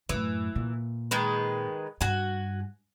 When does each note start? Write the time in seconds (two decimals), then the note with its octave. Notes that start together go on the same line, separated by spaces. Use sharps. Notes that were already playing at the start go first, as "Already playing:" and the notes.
0.09 F#2 A2 E3
0.55 A#2
1.11 D#3 G#3 B4
2.01 G2 F#4 G#5